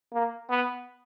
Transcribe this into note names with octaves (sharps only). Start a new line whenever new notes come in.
A#3
B3